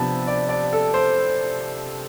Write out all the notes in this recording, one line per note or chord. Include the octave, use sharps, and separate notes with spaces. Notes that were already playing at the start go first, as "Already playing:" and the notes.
Already playing: C3 F3 B3 D4 A5 B5
D5
D5
A4
C5